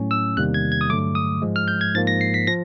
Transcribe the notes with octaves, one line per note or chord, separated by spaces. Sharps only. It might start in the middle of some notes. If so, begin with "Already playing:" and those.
Already playing: A2 F#3 A3 C#4
E6
E2 C3 D#3 G3 A#3 F#6
G#6
G#6
D#6
G2 D3 F#3 A3 D6
D#6
G#2 F3 G#3
F6
G6
G#6
G#2 F3 A#3 A6
A#6
C7
B6
F3 A#6